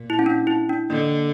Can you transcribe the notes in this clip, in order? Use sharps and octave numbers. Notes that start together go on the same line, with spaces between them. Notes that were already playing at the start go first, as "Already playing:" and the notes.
Already playing: A#2
E4
C#4
D4
E4
D4
D3 A#3